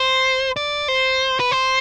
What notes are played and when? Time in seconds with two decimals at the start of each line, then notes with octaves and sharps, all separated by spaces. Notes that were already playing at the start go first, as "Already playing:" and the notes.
Already playing: C5
0.56 D5
0.88 C5
1.40 B4
1.51 C5